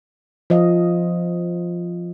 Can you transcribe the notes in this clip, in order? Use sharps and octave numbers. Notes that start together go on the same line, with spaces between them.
F3 D#5 F5